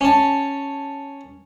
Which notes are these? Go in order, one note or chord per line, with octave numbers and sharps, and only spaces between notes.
C#4 A5